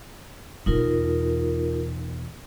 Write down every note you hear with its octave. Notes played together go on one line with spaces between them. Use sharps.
E2 B2 D#4 F4 A#4